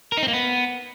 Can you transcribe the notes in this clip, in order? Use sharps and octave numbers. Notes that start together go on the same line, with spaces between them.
A#4
D#4
C4
A#3
B3